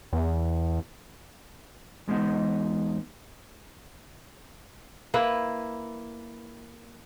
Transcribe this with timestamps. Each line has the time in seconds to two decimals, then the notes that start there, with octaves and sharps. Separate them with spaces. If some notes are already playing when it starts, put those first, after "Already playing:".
0.13 E2
2.08 E2 G#3 B3 D#4
5.14 A#3 E4 B4